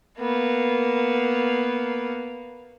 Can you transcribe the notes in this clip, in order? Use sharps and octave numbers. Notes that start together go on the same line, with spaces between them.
A#3 B3